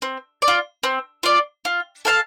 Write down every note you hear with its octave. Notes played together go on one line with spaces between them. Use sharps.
C4
D5
F4
C4
F4 D5
F4
A4 F5 A5